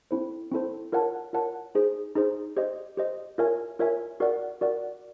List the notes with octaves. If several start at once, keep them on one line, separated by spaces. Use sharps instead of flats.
C4 E4 A4 C5
C4 E4 A4 C5
F4 A#4 C#5 F#5 A5
F4 A#4 C#5 F#5 A5
D#4 G#4 C5
D#4 G#4 C5
G4 C5 D#5
G4 C5 D#5
F4 A#4 C#5 E5 G#5
F4 A#4 C#5 E5 G#5
F#4 A#4 D5 F#5
F#4 A#4 D5 F#5